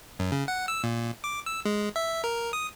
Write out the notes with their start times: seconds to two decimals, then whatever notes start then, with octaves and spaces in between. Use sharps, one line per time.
0.19 F#2
0.32 C#3
0.48 F#5
0.68 E6
0.84 A#2
1.24 D6
1.46 E6
1.65 G#3
1.96 E5
2.24 A#4
2.53 D#6